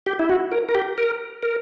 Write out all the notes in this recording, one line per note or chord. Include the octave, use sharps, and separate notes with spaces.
G4
E4
F#4
A#4
A#4
G4
A#4
A#4